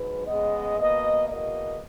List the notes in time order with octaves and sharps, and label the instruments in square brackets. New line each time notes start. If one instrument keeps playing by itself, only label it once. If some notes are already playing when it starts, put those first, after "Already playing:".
Already playing: [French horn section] G#2 F#3 B4
C#3 G#3 B3 D#5
B2 A#3 D#5
E2 B2 A#3 D#5